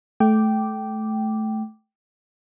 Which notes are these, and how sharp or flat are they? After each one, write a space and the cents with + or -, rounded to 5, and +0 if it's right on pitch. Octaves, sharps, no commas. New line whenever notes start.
A3 -20 G5 -10 D6 +0